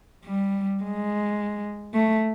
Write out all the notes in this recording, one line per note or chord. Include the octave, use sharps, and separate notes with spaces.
G3
G#3
A3